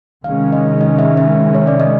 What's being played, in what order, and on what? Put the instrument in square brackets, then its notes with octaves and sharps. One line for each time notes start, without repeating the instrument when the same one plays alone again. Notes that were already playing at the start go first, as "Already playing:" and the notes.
[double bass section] C3 D#3 G#3 C#4 [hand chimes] F5
[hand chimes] D#5
D#5
E5
E5
C#5
D5
D#5